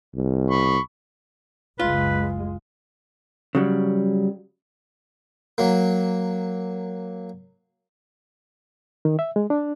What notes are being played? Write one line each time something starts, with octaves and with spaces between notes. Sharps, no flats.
C2
B5 C#6
F#1 C#2 G#3 F4 B4
C#3 F#3 G3
F#3 A#3
D#3
E5
G#3
D4